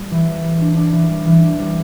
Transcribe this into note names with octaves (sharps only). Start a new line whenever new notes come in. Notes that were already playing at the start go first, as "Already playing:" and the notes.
Already playing: G3
E3
G3
G3
D4
D4
E3
G3
E3
D4
G3